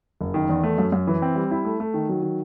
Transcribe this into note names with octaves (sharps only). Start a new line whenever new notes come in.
F#1
D#3
E2
A3
F#2
F#2
E3
C4
G3
E4
A3
A3
D#3
F#3
D#3